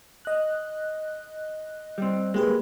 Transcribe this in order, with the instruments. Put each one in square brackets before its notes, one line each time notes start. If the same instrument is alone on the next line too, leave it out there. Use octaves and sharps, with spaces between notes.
[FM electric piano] D#5 F#6
[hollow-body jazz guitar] G3 C4
[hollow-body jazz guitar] G#3 [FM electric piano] A#3 G4 B4